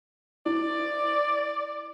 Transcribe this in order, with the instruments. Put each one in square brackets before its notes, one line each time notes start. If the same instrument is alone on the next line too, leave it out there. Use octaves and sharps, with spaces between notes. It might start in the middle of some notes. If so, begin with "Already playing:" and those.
[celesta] E4 [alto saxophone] D5